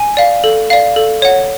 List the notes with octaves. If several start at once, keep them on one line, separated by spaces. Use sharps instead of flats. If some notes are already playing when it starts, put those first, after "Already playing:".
Already playing: G#5
D5 F5
A4
D5 F5
A4
C#5 F#5